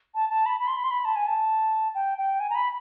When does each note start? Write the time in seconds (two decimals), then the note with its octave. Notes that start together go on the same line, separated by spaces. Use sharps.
0.14 A5
0.29 A5
0.46 B5
0.60 B5
0.67 C6
0.76 B5
0.83 C6
0.90 B5
1.04 A5
1.15 G#5
1.26 A5
1.94 G5
2.18 G5
2.40 G#5
2.50 A#5
2.54 B5